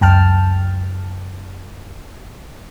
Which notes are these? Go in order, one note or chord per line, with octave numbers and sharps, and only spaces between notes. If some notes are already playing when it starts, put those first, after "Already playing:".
C#2 F#2 G5 A5 F6